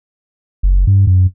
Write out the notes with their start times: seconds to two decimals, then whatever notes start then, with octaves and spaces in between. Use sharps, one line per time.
0.63 F#1
0.87 G2
1.07 F#2